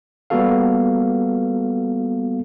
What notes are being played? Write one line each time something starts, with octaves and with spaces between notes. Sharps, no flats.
G3 A#3 B3 F#4 A4 F5